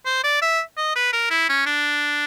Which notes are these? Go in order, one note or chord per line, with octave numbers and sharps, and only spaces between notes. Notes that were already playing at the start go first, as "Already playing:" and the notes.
C5
D5
E5
D#5
B4
A#4
E4
C#4
D4